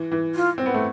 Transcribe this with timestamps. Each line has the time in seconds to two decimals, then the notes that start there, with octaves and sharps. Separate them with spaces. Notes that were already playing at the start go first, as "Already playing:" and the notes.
Already playing: E3
0.12 E3
0.35 F4
0.58 C4
0.66 B3
0.74 A3